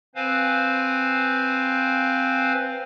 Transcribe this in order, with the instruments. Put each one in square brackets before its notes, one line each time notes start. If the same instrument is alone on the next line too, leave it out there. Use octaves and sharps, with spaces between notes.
[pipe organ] C4 B4 C5 F5 G#5